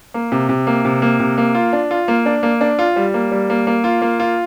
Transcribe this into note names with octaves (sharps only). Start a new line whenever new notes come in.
A#3
C3
C3
A#3
C3
A#3
C3
A#3
F4
D4
F4
A#3
D4
A#3
D4
F4
G3
A#3
G3
A#3
A#3
F4
A#3
F4